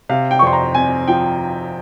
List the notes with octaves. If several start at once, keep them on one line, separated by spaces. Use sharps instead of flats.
C3 F5
G5
C#6
F2 C6
A#5
C4 G#5
F3 G5